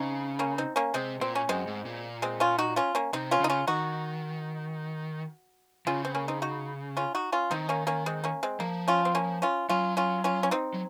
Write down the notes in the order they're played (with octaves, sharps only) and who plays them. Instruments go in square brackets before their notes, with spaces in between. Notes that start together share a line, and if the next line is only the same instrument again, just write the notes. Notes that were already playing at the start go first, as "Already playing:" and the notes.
Already playing: [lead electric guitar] C#3 [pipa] C4 D#4
[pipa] A#3 C#4
C4 D#4
A#3 C#4
[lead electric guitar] C3 [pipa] G#3 C4
[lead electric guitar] A#2 [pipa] C4
[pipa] C#4
[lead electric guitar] F#2 [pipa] G#3 C4
[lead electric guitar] G#2
A#2
[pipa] G#3 C4
C#4 F4
D#4 F#4
C#4 F4
A#3 C#4
[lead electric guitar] C3 [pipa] C4 D#4
[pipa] C#4 F4
[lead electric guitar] C#3 [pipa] D#4
[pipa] C#4 F4
[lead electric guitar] D#3 [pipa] D#4 F#4
[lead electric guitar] C#3 [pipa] C#4 F4
[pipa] C4
A#3 C#4
C4 D#4
D#4 F#4
C#4 F4
D#4 F#4
C#4 F4
[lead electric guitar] D#3 [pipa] C4 D#4
[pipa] A#3 C#4
A#3 C#4
G#3 C4
A#3 C#4
G#3 C4
[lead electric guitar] F3 [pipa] A#3
[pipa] C#4 F4
C4
A#3 C#4
C#4 F4
[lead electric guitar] F#3 [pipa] C#4 F4
[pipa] C#4 F4
C#4 F4
C#4
C4 D#4
[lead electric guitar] F#3